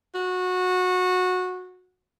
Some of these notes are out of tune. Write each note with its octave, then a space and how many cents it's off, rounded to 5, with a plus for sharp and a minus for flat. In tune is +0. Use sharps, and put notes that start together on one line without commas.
F#4 -20